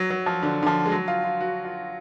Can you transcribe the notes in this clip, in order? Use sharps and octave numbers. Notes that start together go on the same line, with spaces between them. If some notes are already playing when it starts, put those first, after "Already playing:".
Already playing: F#3
F#3
F3
D3
D3
F3
G#3
F#3
F4
F4
F#4
F4